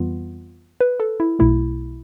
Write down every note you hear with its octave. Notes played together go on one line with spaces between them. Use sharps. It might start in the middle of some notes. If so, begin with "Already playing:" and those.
Already playing: F2 E3 G3 B3 F4
B4
A4
E4
B1 B2 A3 E4